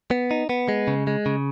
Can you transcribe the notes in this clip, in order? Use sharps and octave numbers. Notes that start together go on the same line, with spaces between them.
B3
D#4
B3
G#3
C#3
G#3
C#3